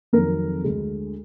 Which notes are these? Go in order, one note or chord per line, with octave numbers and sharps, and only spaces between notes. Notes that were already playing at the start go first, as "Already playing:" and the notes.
F2 D#3 F#3 A#4
D2 D3 G#3